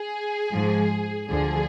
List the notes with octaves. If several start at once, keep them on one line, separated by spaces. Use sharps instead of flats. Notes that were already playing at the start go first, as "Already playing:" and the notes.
Already playing: G#4
G#2 F3 G#3
D2 D3 F3 G#4